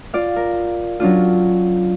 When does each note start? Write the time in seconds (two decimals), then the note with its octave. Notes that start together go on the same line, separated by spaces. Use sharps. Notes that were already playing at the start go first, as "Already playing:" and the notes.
0.14 F4 D5 F5
0.36 A#4
1.00 F#3 C#4 D4 F4